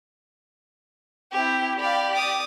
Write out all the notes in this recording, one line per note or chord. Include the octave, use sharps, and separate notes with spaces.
C4 E4 G4
G4 D5 F5 B5
D6 D#6